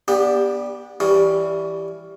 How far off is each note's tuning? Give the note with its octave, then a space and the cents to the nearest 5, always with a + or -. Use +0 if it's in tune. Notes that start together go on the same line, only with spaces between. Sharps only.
B3 -25 D4 +0 G4 +15
E3 +0 G3 +0 C#4 +15